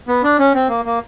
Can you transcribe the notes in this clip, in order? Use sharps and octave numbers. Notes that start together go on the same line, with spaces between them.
B3
D4
C#4
C4
A#3
A#3